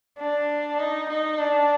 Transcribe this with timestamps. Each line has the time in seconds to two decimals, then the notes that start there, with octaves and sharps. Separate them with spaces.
0.19 D4
0.79 D#4
1.09 D#4
1.39 D4